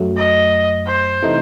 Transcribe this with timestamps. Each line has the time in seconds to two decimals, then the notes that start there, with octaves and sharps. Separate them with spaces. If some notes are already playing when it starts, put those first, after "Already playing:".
Already playing: F#2 F#3 A3
0.17 D#5
0.87 C5
1.23 C3 E3 A3 D#4